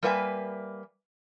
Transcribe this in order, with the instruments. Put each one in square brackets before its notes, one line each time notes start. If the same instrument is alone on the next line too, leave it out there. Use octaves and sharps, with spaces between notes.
[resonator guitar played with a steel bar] G3 A#3 B4 E5 G#5